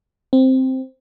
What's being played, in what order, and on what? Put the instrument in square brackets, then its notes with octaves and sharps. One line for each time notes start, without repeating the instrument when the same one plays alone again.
[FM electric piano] C4